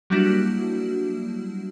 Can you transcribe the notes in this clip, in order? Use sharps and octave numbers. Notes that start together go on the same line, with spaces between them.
F#3 G3 A#3 D4 E4 F#4